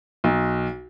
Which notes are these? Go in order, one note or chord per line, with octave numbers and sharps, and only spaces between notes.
B1